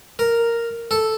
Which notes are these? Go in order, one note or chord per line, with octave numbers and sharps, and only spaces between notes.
A#4
A4